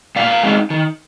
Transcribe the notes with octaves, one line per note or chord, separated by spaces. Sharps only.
A#2 D5 F5
G#3 C4 D#4
D#3